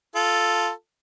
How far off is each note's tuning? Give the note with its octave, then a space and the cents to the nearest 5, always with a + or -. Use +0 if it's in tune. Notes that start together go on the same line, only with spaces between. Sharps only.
F4 +0 A4 +0